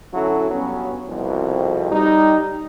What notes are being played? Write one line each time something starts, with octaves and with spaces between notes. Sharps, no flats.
D3 F#3 C#4 E4 F#4 A4
G2 F#3 B3 C#4
C2 F2 B2
G3 D#4